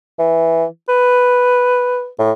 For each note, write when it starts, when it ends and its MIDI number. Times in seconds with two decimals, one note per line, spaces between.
0.19 0.65 52
0.89 2.08 71
2.19 2.32 45